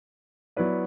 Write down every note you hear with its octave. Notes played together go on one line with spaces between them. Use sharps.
F#3 B3 E4 B4 D5